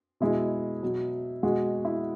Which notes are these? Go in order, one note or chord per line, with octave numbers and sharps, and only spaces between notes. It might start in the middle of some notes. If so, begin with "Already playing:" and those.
B2 G#3 E4
B2 F#3
B2 G#3 F#4
E4